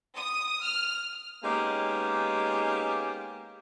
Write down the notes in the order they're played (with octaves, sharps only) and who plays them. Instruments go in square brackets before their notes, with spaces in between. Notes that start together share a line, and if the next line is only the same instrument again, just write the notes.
[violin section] D#6
F6
[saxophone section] G#3 A#3 B3 C#4 D#4 G4